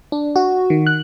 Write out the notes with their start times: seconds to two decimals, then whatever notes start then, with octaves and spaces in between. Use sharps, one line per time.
0.12 D4
0.36 F#4
0.70 D#3
0.87 F#6